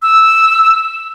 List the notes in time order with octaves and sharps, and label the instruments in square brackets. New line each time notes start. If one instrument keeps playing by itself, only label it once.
[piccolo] E6